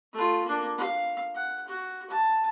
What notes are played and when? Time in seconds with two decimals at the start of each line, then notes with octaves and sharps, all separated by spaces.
0.13 A3 F4
0.45 A#3 D4
0.78 F5
1.35 F#5
1.68 F#4
2.10 A5